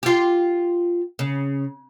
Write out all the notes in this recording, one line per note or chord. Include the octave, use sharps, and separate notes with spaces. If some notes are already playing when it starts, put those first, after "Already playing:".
F4 G4
C#3